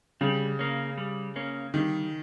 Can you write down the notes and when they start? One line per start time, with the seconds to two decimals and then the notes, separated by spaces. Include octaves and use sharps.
0.21 C#3 G3
0.59 A#3 C#4
0.98 G3
1.36 A#3 C#4
1.74 D#3 G3